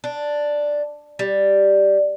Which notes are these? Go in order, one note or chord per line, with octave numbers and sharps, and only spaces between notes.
D4
G3